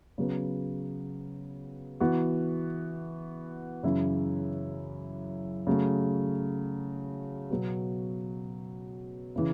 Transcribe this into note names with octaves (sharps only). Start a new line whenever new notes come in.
C#3 F#3 B3
E3 B3 F#4
F#2 C#3 E3 C#4 E4
C#3 F#3 A3
B2 F#3 B3 F#4
C#3 E3